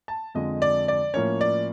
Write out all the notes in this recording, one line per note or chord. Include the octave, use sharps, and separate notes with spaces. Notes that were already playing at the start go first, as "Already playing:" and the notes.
A5
F2 D3 F3 G#3 D#5
D5
D5
A2 F3 A#3 C#4 C#5
D5